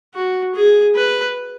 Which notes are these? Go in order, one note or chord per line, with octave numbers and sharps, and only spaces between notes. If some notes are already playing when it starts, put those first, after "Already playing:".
F#4
G#4
B4